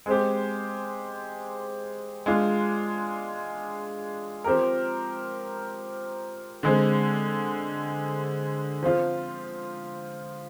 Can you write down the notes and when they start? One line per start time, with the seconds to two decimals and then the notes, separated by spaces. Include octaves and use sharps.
0.06 G#3 C4 G4
2.26 G#3 D4 F4
4.44 F3 C4 G4 A#4
6.63 D3 G#3 C4
8.83 F3 C4 F4